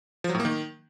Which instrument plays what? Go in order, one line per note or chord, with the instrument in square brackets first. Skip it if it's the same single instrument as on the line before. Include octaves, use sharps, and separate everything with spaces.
[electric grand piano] F3
F#3
A2
A#3
D#3